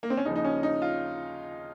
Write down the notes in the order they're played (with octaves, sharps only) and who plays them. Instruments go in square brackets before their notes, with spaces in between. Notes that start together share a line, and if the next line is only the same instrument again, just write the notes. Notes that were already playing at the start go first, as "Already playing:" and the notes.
[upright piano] A#3
C4
C#4
D#2 C#3 F3 D#4
D#4
C#4
D#4
F4